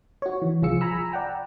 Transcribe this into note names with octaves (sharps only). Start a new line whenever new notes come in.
F#4 C#5
E3
C2 F3 F4 G#4 E6 C#7
G#5 A#5 B5 E6
D5 F#5 G5 A#5